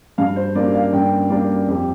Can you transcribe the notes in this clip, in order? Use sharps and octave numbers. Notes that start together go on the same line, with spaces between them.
G2 F5
C5
G3 A#3 D4 D5
F5
G2 G5
G3 A#3 D4 D5
F2 G4